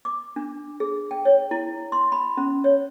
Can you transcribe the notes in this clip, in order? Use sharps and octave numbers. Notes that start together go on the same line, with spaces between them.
D6
D4
G#4
G5
C#5
E4
C6
B5
C#4
C#5